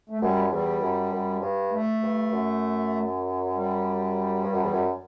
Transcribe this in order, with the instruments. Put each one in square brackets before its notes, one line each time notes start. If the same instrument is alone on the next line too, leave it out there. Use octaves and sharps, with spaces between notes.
[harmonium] A3
[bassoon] F#2 [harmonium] G3
[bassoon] E2 [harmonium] G3
[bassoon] F#2
F#2
G2
[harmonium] A3
[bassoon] G2
F#2
[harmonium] G3
[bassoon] G2
F#2
E2
F#2